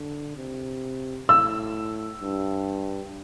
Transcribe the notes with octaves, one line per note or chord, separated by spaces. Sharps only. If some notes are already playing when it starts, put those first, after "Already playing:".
Already playing: D3
C3
A2 E6
G2